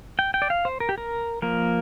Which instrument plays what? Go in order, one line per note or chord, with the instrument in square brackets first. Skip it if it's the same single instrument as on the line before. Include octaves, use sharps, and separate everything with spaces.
[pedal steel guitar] G5
G5
D5
F5
C5
A#4
G4
A#4
F3 A#3 A#4